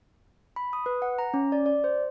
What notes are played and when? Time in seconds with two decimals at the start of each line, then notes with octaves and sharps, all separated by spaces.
0.56 B5
0.73 D#6
0.86 B4
1.02 F#5
1.19 A#5
1.34 C#4
1.52 D5
1.66 D5
1.84 C5